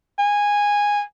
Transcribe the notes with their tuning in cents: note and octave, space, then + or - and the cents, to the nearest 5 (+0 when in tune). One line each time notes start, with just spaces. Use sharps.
G#5 -10